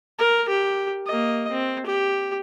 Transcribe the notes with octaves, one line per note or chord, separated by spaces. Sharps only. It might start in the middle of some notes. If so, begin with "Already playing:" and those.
A#4
G4
A#3 D#5
C4
G4